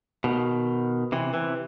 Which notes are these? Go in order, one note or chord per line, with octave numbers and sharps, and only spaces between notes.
B2 D#3
C3 E3
C3 E3